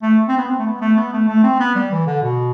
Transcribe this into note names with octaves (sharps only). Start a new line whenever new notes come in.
A3
C4
B3
C4
A3
B3
A3
B3
A3
A3
C4
B3
G3
E3
D3
B2